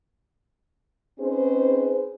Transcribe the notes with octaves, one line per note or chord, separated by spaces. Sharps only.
C4 C#4 D#4 G#4 B4 C5